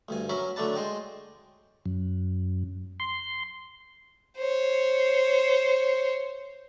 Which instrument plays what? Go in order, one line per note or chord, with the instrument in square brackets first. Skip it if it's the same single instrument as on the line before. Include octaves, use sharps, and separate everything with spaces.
[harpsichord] D2 G2 G#5
F#3 C#4 A#4 E5 B5
D3 F#3 A3 D4 B4 A5
G#3 C5 D#5 G5
[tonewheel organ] F#2
C6
[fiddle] C5 C#5